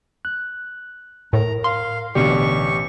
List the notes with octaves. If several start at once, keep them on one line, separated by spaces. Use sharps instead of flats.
F#6
A2 A#4 A#5
F5 C6
A1 B2 D3 G4 D5 C#6